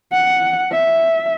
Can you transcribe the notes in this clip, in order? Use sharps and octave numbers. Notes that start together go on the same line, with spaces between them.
F#5
E5